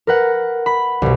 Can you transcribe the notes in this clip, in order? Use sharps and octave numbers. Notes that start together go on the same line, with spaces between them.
A#4 B4 F#5
B5
C2 B2